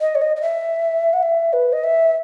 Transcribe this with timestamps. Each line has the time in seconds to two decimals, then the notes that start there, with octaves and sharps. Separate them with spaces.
0.01 D#5
0.15 C#5
0.22 D#5
0.36 D#5
0.41 E5
1.13 F#5
1.23 E5
1.53 B4
1.73 D#5
1.84 E5